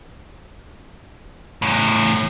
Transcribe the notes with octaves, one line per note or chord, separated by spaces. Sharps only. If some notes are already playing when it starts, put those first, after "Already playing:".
E2 A2